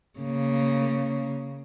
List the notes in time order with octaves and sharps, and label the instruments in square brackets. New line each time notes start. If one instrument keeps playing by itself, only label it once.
[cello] C#3 A#3